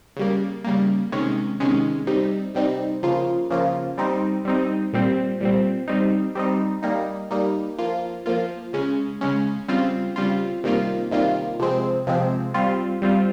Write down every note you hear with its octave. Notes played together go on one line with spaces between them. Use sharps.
C#3 G3 A#3
C#3 G3 A#3
C3 D#3 G#3 C#4
C3 D#3 G#3 C#4
C3 G3 C4 D#4
C3 G3 C4 D#4
C#3 F3 A#3 F4
C#3 F3 A#3 F4
G3 C4 D#4
G3 C4 D#4
A#2 G3 C4
A#2 G3 C4
G3 C4 D#4
G3 C4 D#4
G3 A#3 D#4
G3 A#3 D#4
F3 A#3 F4
F3 A#3 F4
C#3 G#3 C#4
C#3 G#3 C#4
C#3 G3 C4 F4
C#3 G3 C4 F4
C3 D#3 G3 A#3 F4
C3 D#3 G3 A#3 F4
C3 F3 G#3 C4
C3 F3 G#3 C4
G3 C4 F4
G3 C4 F4